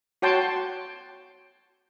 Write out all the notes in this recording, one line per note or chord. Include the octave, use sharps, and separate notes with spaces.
F#4 C#5 G5 A5 C6